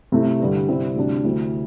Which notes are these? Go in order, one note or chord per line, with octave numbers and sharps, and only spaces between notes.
C3 A3 E4
G2 D3 G3
C3 G3 C4 E4
D2 C3 G3 D4
D2 C3 A3 C4 E4